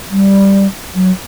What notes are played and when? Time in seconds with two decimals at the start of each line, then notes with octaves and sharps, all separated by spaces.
0.11 G3
0.95 F#3